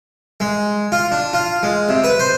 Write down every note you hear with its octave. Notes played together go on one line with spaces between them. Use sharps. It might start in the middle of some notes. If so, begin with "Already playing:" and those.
G#3
F4
D4
F4
G#3
C3
B4
C5